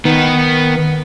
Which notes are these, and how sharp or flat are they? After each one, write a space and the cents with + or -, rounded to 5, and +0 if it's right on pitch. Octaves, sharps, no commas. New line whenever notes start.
D#3 +0 B3 +0